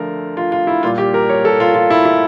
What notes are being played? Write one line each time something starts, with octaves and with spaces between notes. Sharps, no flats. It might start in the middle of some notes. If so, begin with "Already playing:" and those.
Already playing: D3 F3 A3 A#4
F4
F4
E4
A#2 G3 F4
G4
A#4
C#5
A4
F4
F4
E4
E4